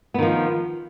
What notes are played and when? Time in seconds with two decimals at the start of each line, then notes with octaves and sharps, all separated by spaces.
0.14 B3
0.18 D#3
0.23 F3